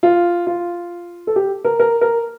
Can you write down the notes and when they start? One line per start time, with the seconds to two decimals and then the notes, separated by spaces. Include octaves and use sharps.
0.03 F4
0.47 F4
1.27 A4
1.36 G4
1.64 A#4
1.80 A#4
2.01 A#4